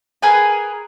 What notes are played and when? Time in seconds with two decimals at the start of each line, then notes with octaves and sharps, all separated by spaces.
0.22 G#4 A#4 B4 G#5